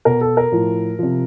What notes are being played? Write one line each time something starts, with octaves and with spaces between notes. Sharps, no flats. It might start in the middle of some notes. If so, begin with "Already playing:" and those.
B2 A#4
A4
A#4
A2 F3
C3 F3